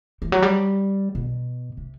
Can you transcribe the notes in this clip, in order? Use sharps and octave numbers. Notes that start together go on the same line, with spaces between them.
E3
F#3
G3
B2
C3